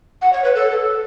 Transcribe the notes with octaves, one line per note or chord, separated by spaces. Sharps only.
F#5
C#5
B4
A4